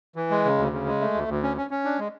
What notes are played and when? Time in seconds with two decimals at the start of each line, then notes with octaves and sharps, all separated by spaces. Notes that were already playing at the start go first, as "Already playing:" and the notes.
0.16 E3
0.30 G#3
0.45 C#3
0.58 D2
0.72 C#3
0.86 G#3
1.01 A3
1.14 D2
1.28 D2
1.43 C#4
1.57 C#4
1.70 C#4
1.85 D4
1.99 G#3